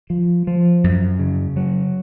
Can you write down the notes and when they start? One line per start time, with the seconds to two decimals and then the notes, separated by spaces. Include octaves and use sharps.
0.10 F3
0.47 F3
0.84 F#2
1.19 C#3
1.56 F#3